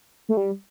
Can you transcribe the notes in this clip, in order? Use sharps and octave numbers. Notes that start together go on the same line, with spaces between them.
A3
G3